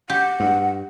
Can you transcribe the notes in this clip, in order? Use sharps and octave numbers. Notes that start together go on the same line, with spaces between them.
G4 F#5
G2